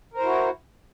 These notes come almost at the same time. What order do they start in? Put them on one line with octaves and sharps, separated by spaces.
A#4 C5 E4 F#4